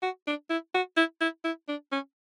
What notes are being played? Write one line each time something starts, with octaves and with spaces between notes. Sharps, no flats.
F#4
D4
E4
F#4
E4
E4
E4
D4
C#4